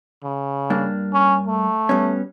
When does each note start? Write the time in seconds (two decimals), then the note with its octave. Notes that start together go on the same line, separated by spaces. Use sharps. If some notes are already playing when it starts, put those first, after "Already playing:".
0.23 C#3
0.70 G2 A#3 D4
1.14 C#4
1.47 A3
1.89 G3 B3 C#4